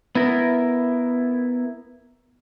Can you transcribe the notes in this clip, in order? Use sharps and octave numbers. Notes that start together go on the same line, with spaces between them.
B3 E4 A#4